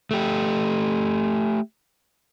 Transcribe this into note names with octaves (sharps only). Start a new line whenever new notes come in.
A3 G4